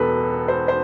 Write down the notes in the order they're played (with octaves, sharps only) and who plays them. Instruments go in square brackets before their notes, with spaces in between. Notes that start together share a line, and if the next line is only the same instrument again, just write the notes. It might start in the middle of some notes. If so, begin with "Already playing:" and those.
Already playing: [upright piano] E1 B2 A4 B4
C5
C5